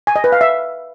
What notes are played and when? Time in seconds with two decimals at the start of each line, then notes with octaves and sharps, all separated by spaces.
0.07 G#5
0.16 D#5
0.24 B4
0.32 F5
0.41 E5